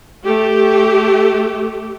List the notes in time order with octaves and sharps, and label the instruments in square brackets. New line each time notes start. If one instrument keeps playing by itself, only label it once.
[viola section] A3 G4